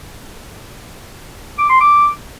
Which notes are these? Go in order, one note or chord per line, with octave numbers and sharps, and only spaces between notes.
D6
C6
D6